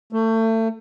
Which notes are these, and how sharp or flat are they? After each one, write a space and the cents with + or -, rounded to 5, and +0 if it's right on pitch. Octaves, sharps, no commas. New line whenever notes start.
A3 +30